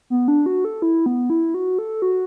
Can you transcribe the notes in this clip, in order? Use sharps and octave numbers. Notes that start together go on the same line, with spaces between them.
B3
D4
F#4
A4
E4
B3
E4
F#4
A4
F#4